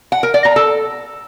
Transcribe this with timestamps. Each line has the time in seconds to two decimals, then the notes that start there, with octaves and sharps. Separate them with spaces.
0.12 F#5
0.23 A#4
0.34 D5
0.45 A#5
0.56 A4